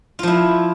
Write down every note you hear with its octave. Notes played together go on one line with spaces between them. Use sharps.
F3 E4 F4